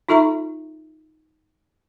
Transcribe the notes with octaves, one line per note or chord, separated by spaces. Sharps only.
D#4 F4 A4 E5 A#5 C#6